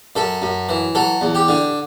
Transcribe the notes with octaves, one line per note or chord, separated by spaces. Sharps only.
F#2 A4
F#2
E3
F#3 A4
E2
G4
D3